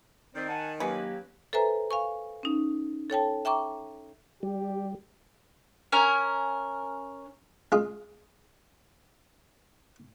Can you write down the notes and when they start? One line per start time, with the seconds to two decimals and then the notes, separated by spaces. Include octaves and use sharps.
0.35 D#3 C4 C5 D5
0.49 F#5 G#5 A5
0.80 F#3 A#3 C#4 F4 G4 B4
1.53 A4 B4 C5 E5 G#5 A#5
1.91 F5 G#5 C#6
2.43 C#4 D#4
3.10 A4 C#5 G5 A5
3.45 E5 G5 A#5 C#6 D6
4.43 G3 G4
5.92 C#4 A#4 G#5
7.72 G#3 F4 G#4